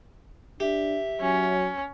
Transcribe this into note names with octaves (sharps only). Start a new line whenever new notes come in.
D4 G4 E5
F#3 C#4